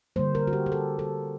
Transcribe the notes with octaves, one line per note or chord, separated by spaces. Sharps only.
D3 G3 A#3 C5
A#4
F#4
G4
G4
A4
A4